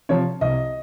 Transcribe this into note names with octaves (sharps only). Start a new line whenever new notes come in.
C3 F3 C#5
C2 D#5